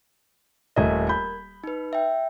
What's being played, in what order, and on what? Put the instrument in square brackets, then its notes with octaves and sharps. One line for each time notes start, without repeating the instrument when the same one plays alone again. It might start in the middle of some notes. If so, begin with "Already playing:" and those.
[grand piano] D#1 A3 D#5 [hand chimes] A#4 G#6
[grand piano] B5 G6
[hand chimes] D#4 B4
E5 G5